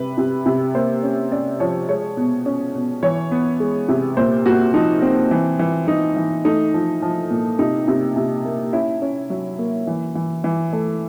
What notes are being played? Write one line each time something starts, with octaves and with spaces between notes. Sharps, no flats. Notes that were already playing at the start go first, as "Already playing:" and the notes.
Already playing: C3 G3 B4
C3
C3
A#3 C5
C#4
C#4 D5
F3 C#5
G#3 C#5
B2
C#4
B2
E3 C#5
B3
G#3
C3
A#2 C5
A#2 F#4
F3 D#4
C4
E3
E3
E3 D#4
E3
A3 D#4
F3
F3
A#2
C3 D#4
C3
C3
A#3
C#4 E4
C#4
F#3
A#3
E3
E3
E3
A3